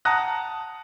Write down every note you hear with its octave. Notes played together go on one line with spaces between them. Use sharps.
F#5 A5 A#5 D#6 F#6 A#6